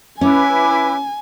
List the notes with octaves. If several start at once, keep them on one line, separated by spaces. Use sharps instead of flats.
C#4 E4 B4 G#5 D6